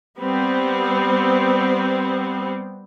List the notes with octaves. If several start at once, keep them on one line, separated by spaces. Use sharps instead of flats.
G3 B3 C4